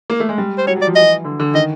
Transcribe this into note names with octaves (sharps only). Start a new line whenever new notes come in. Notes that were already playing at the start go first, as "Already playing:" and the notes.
A#3
A3
G#3
G3
C5
F#3 C#5
F#3 D5
F3
E3 D#5
D3
D3
D#3 D#5